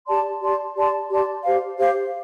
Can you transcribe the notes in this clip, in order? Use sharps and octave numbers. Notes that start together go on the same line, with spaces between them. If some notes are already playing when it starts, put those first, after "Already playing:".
G4 D5 A5 C6
G4 D5 A5 C6
G4 D5 A5 C6
G4 D5 A5 C6
G4 C5 F5
G4 C5 F5